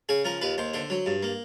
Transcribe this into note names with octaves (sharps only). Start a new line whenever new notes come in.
C#3 G#4
F3 A#4
D#2 B4
D#2 C5
D3 C5
F#3
G2
A#3